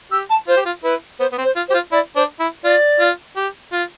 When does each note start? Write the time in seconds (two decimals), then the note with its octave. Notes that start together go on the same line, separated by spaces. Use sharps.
0.11 G4 E6
0.30 A5
0.47 F4 C5
0.57 G4
0.65 F4
0.83 E4 B4
1.19 B3 C5
1.32 B3
1.38 C4
1.44 C5
1.56 F4
1.68 G4 C5
1.74 F4
1.92 E4 D5
2.16 D4 C5
2.39 E4
2.64 F4 D5
3.00 F4
3.36 G4
3.72 F4